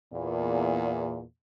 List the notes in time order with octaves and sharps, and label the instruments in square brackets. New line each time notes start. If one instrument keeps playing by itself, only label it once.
[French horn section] E2 A#2